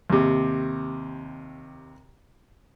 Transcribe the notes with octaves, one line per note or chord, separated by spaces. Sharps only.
D#2 C3